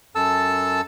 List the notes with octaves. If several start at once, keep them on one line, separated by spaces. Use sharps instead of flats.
F#2 A4 A5 E6